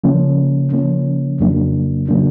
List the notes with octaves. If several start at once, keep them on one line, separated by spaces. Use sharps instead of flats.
C#3 F3 A#3 C#4
C#3 F3 A#3 C#4
F2 C#3 F#3 A#3 D4
C#3 F#3 A#3 D4